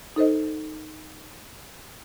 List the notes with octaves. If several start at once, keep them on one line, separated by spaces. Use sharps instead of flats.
D#4 A4 C5 D#5